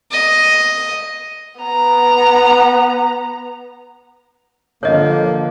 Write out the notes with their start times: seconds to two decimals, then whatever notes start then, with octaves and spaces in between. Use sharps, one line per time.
0.11 D#5
1.61 B3 A#5
4.83 D3 F3 A#3 C#5 D#5